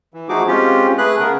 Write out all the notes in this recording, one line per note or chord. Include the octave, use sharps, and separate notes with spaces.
E3
F3 A3 D#4 F#4 G#4 D6
G#3 C4 C#4 F4 G4
A3 G#4 B4 F#6
C#3 B3 G#4 A#4